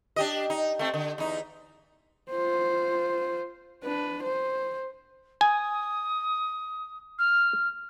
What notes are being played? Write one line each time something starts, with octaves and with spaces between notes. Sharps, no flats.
D4 G4 D#5
D#4
A3 C4
D3
E2 D#4
F4 C5
D4 B4
C5
G#5 D#6
F6